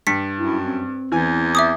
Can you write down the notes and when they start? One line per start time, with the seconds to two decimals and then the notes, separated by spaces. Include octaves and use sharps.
0.07 G2 B6 C#7
0.38 F#2 E4
0.64 C4
1.12 E2 E3 G#5
1.55 E5 D6 D#6